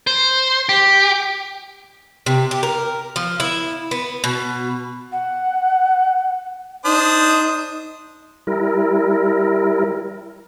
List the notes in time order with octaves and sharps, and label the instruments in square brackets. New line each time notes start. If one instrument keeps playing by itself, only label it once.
[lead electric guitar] C5
G4
[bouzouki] C3
G4
A#4
F3
E4
B3
B2
[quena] F#5
[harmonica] D4 C5 D#6 [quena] D#4
[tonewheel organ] G3 E4 A#4